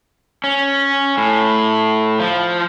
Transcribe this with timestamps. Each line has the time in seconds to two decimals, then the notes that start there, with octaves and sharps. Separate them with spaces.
0.44 C#4
1.17 A2
2.20 F3